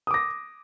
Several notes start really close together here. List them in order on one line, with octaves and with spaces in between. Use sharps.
D#6 D6 A#6